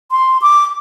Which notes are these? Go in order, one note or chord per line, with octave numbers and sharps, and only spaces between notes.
C6
D6